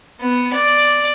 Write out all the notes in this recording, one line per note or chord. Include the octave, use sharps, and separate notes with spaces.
B3
D5